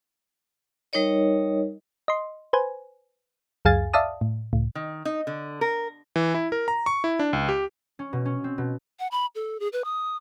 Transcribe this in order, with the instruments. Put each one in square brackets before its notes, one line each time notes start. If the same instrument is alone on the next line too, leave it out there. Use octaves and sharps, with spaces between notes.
[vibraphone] G3 D#4 A#4 C#5 D#5
[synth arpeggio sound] D#5 C6
B4 C5 G#5
C#2 F#2 G#4 F5 G#5 A6
D5 E5 F5 A5 D#6
A2
C#2 A2
[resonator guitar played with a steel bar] D#3
D#4
D3
A#4
[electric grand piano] E3
E4
A#4
A#5
C#6
E4
D4
C#2
G4
[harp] C#4
B2
C#4
C4
B2
[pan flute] F#5
B5
A4
G#4
B4
D#6